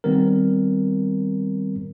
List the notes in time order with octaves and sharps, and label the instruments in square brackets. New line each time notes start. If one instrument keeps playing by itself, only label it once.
[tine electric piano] D#3 G3 B3 C4 A#4